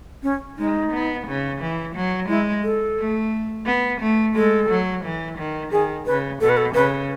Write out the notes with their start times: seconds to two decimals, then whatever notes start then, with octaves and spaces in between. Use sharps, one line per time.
0.23 C#4
0.58 G#3 D#4
0.92 B3
1.26 C#3
1.61 E3
1.95 F#3
2.28 G#3 E4
2.63 A4
2.98 A3
3.66 B3
4.01 A3
4.35 G#3 A4
4.69 F#3
5.03 E3
5.38 D#3
5.72 D#3 G#4
6.06 C#3 B4
6.41 B2 A4
6.49 B4
6.57 A4
6.74 C#3 B4